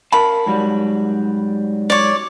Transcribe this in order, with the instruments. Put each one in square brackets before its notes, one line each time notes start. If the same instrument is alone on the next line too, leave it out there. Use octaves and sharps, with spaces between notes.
[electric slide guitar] A#4 F5 A5 [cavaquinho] B5
[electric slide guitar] G#2 F#3 G3
[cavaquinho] C#5 D5